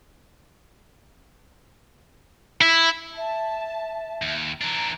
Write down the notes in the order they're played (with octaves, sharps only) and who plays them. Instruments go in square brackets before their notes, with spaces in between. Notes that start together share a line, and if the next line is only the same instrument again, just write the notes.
[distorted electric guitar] E4
[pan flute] E5 [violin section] A5
[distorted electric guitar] D#2
[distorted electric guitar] E3 D4 [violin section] A#5